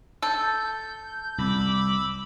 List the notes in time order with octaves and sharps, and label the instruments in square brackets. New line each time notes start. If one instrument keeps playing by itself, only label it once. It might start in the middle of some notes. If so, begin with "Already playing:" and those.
[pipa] A4 [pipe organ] G6
[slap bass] C2 [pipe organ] B5 D6 E6